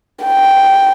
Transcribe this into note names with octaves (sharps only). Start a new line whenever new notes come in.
G5